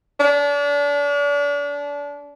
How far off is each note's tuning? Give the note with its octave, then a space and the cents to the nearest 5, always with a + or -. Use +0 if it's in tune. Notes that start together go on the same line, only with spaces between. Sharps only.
D4 -35